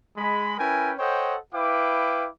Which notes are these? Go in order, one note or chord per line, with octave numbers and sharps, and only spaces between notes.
G#3 B5
C#4 E4 A#4 B4 G5 G#5
A4 C5 C#5 D#5 F#5 G5
E4 B4 F5 G5 D6